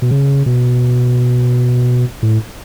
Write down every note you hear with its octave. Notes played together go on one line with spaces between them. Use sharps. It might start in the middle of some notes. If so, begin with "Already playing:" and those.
B2
C#3
B2
A2